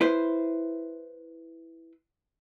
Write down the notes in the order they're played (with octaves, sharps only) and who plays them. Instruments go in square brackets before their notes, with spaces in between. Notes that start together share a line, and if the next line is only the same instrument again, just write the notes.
[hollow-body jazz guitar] E4 B4 C5